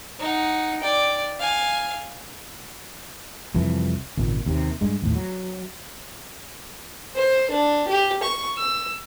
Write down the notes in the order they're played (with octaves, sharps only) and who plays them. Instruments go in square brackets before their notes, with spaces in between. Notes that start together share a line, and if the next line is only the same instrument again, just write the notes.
[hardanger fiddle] D#4 F#5
D5 G5
F5 G#5
[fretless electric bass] C2 F2 E3
G#1 C#2 A#2
D#2 C3
G2 G#3
D#2 A2
F#3
[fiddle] C5
D4
G4
C#6
E6